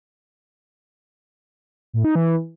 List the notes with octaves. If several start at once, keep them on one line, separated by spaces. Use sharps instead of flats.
A2
D#4
E3